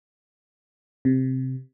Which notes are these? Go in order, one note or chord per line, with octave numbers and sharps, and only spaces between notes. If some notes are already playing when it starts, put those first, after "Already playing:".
C3